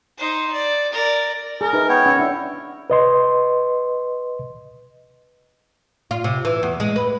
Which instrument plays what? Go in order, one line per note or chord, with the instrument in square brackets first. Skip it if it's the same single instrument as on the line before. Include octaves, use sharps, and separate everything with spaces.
[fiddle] D#4 C5
D5
A#4 D5
[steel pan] G#4 [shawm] A#4
[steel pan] D#4 B4 E5
[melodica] B3 G5 [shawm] C#5
[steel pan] C#4 F#5 E6
[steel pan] D4 [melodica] E4
[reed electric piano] B4 D#5 C6
[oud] F4
C3
E3
E2
G#3
B4